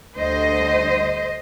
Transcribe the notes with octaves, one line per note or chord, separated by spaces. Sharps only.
D2 D3 G3 C5 D#5